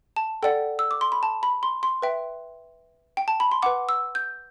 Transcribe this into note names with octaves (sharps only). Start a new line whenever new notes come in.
A5
A4 D5 F#5 G5
E6
D6
C6
B5
A5
B5
C6
C6
B4 E5 G5
G5
A5
B5
C6
B4 F#5 D6
E6
G6